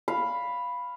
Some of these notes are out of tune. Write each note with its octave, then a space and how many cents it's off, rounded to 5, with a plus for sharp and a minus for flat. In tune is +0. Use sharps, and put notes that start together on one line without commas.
F5 +0 B5 +0